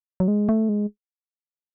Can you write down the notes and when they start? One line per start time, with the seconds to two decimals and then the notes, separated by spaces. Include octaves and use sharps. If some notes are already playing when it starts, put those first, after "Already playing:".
0.20 F#3
0.28 G#3
0.49 A3
0.69 G#3